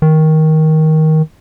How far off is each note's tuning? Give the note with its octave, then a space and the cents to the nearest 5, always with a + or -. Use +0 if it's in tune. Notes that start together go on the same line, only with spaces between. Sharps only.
D#3 +15